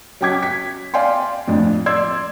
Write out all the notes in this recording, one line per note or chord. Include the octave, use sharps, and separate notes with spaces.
F#3 C#4 G5 D6 G#6 B6
B6
D5 F5 G5 G#5 C6
F2 A2 F3 D4
D5 C6 E6 G#6